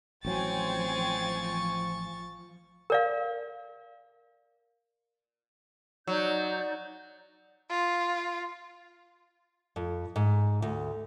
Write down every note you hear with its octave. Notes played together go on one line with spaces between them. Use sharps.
A1 F3 F#3 C4 G5 G#5 C#6 A6
A#4 D5 F5
F#3 D#4 D5 G6
F4
F2
G#2
D2